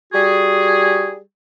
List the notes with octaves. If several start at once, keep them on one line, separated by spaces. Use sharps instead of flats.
G3 F#4 G#4